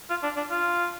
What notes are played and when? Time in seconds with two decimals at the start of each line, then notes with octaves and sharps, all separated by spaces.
0.10 F4
0.23 D4
0.37 D4
0.51 F4